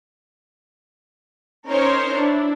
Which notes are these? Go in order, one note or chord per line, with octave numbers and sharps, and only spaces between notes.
C#4 D#4 A#4 C5 C#5
D4 E4